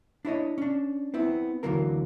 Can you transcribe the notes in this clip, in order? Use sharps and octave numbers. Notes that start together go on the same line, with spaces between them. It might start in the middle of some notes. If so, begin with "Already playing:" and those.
D4 E4 C#5 D#5
C#4 D4
B3 C4 E4
D2 D3 E3 F#3 A#3 A#4